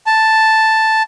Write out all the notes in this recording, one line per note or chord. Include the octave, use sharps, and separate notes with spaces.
A5